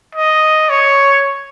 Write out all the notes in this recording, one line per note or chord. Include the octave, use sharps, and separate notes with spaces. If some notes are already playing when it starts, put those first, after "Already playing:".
D#5
C#5